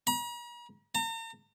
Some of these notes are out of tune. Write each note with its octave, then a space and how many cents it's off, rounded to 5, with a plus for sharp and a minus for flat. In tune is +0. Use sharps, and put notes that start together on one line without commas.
A#5 +45
A#5 -45